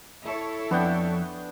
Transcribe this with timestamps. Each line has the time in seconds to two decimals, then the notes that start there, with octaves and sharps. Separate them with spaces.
0.24 E4 A4 C#5
0.71 F2 B3 D4 G5